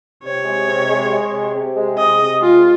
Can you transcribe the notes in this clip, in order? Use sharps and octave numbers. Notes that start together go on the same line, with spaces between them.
C3 C#5
G#3
C3
G#3
G#3
C3
C3
G#3
C3 D#5
C3
G#3 F4